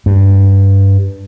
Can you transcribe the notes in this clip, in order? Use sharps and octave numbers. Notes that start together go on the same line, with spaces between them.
G2